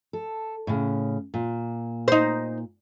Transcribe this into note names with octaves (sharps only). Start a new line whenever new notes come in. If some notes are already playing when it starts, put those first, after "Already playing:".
A4
A2 C#3
A#2
D#4 C5